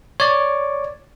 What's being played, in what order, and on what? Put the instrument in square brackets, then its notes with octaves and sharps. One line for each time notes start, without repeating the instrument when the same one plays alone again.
[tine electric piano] C#5 D5